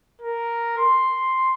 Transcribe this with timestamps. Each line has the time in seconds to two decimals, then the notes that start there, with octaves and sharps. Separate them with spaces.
0.22 A#4
0.78 C6